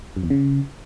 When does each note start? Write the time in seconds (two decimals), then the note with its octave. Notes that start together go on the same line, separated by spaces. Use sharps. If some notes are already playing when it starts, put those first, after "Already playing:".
0.17 F#2
0.23 E2
0.30 C#3